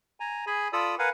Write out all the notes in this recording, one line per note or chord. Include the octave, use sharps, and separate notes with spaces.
G#5 A#5
G#4 G#5 B5
F4 A4 D5 B5 D#6 E6
A#4 B4 F5 F#5 G#5